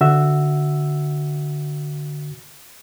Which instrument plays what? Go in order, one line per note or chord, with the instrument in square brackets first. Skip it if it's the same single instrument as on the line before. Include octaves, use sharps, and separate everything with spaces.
[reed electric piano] D3 F#4 E5 E6